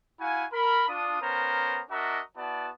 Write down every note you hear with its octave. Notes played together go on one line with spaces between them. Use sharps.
E4 F#4 F5 G#5
A#4 B5
D4 F4 D#6
B3 C#4 A#4 C5 A#5
D4 F#4 A#4 D#5 E5 A#5
B3 E4 F#4 D5 A5